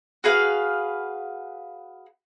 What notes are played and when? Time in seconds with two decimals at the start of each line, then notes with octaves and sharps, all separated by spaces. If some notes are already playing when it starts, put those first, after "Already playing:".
0.24 F#4 G#4 B4 F5